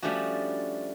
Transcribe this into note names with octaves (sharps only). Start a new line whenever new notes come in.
F3 G3 A3 C#4 D4 F#4